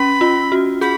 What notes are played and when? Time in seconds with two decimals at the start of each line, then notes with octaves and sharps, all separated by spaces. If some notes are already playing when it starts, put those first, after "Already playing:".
Already playing: C#4 B5
0.21 F4
0.52 F#4
0.81 G#4 B5